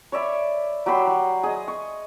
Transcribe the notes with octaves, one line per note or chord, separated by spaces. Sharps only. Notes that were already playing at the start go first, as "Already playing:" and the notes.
C#5 D5 E5 B5
F#3 G4 B5 C6
F#3
G#4 D#5
C#6